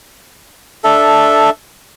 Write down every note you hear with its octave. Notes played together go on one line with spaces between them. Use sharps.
D4 A4 E5